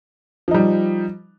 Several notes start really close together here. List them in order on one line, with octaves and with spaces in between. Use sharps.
F3 D#4 G3